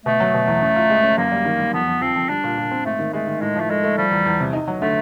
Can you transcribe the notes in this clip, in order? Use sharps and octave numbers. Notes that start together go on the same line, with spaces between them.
B2 A3
F#3
B2
E2
C#4
F4
G#3
C#4
F#2 A#3
G3
D#3
G3
F2 B3
F2
F3 C4
F2
G3 D4
A#2
A#2
C4
G#2 A3
D#3
G#3 A3
D#3
A2 G#3
F3 A3
G#3 A3
A3
F3 G3
E2
E2
C3
D#4
F#3
D3 A3